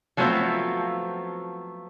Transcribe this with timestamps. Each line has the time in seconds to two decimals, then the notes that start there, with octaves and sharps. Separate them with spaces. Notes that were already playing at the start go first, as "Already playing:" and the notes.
0.17 F3 F#3 A3 B3 C4 F4